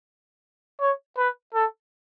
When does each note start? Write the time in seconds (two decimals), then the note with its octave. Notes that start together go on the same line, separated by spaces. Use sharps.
0.80 C#5
1.17 B4
1.54 A4